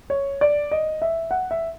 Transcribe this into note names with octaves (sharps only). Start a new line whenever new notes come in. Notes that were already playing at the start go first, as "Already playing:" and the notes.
C#5
D5
D#5
E5
F#5
E5